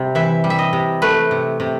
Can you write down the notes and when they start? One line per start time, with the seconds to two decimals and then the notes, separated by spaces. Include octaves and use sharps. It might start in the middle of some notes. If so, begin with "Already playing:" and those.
Already playing: C3 G3
0.15 E3 E5
0.44 G3
0.50 E5
0.59 D#5
0.73 C3
1.02 A3 B4
1.31 C3
1.60 C3